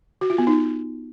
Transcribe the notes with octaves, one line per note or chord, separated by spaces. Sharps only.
F#4
F4
B3
D#4